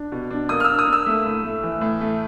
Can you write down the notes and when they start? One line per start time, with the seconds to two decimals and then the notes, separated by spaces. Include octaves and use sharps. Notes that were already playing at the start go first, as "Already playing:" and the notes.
Already playing: D4
0.12 B2
0.30 D4
0.49 A#3 D#6
0.60 F6
0.64 E6
0.69 D4
0.79 D#6
0.87 A#3
0.93 E6
1.06 A3
1.26 A2
1.44 A3
1.63 E3
1.81 A2
2.01 A3